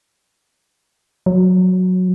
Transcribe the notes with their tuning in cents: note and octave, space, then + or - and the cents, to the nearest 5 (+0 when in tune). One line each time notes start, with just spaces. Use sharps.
F#3 -10